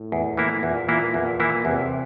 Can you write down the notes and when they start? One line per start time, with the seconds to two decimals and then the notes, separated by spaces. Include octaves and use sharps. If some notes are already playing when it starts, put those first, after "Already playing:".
Already playing: A2
0.12 E2
0.37 E3 A#3 E4
0.63 E2 A#2
0.88 E3 A#3 E4
1.14 E2
1.40 E3 A#3 E4
1.65 E2 C3